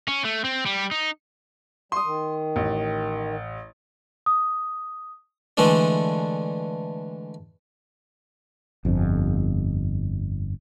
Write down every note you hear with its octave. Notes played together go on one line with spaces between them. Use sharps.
C#4
A3
C4
G3
D#4
G3 C6 D#6
D#3
A1
D#6
D3 E3 G#3 A3 D4
G1 F2